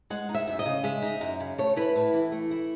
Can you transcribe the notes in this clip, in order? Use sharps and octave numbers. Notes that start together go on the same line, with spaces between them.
G#3 F#5
D#4
E5
F#2
D#5
C#3
G#3 E5
D#4
F#2
C#3
A3 C#5
E4 B4
A2 B4
E3
A3
E4